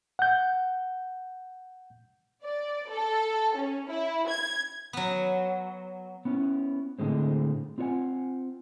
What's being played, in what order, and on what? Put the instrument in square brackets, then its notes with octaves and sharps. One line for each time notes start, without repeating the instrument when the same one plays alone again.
[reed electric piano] F#5 G6
[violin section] D5
A4
C#4
E4
G#6
[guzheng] F#3 B3
[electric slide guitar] B3 C#4 E4
A2 D3 G#3 C4
C4 F4 F#4 C#5 F#5 G#5